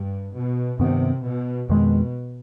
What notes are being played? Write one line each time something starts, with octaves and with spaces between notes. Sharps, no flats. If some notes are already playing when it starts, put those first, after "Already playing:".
Already playing: G2
B2
G2 C3 D#3 B3
B2
F2 B2 D#3 G#3